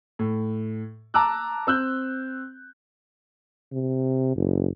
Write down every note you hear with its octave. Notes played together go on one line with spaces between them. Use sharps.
A2
A5 A#5 D6 E6 F#6
C4 E6 F#6 G6
C3
F#1